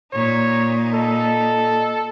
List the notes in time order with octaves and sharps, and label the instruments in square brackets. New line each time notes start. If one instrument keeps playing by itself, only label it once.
[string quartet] A#2 D#4 [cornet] C#5
[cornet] A4 [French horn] D#5